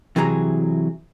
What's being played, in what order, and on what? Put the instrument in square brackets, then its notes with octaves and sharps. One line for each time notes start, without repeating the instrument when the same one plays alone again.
[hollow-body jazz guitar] C3 E3 F#3 G#4 A#5